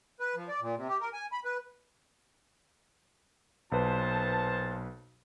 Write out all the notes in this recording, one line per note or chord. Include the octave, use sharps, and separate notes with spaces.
B4
F3
D5
A#2
C3
G4
A#4
G#5
B5
B4
B1 A#2 B4 C5 A5